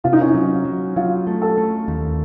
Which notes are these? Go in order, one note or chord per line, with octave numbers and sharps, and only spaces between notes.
C3 F4
D#4
C#4
D#4
F#3
F#3
F#3 F4
A3
A4
A3
D#2